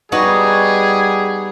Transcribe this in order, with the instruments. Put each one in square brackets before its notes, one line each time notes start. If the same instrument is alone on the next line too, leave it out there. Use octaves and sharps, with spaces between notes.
[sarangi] G3 [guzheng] B3 D#4 F#4 [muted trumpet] G#4